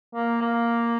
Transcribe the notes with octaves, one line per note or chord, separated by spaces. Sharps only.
A#3
A#3